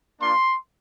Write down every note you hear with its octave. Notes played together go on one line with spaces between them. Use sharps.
A#3 D4 F4 C6